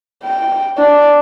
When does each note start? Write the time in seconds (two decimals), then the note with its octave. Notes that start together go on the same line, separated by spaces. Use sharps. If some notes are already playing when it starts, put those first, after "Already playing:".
0.24 G5
0.78 D4